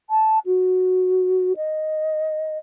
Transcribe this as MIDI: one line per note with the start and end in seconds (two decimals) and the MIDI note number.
0.10 0.39 81
0.46 1.53 66
1.57 2.58 75